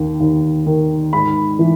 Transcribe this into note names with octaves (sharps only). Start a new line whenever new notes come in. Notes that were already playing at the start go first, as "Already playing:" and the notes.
Already playing: D#2 D#3
D#2
D#3
G#2 B5
E3